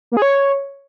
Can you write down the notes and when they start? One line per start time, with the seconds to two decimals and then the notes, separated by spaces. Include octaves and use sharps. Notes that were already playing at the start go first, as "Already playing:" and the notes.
0.12 A#3
0.17 G#4
0.22 C#5